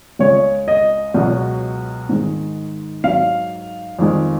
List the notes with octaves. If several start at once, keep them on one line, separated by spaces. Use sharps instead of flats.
C#2 C#3 G#3 C#5
D#5
C#2 B2 F#3
G#2 D#3 G#3
G#2 F#3 F5
F2 D#3 G#3